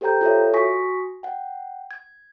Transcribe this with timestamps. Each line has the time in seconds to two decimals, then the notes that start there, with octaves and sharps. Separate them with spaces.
0.01 G4 A4 C5 G5 A#5 G6
0.21 F4 A4 C#5 E5
0.53 F#4 G#5 C#6 D#6 A#6 B6
1.23 F#5 G5
1.91 G#6